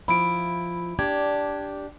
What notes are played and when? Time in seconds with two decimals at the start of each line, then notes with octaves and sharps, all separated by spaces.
0.08 F3 E4 B5 D7
0.99 D4 G4 G#6